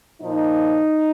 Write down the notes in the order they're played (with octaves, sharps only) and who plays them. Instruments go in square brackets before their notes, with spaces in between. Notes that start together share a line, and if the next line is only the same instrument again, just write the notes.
[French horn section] A#2 F3 D#4